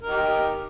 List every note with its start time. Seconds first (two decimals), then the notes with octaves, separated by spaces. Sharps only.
0.02 A#4
0.05 D#4
0.08 G4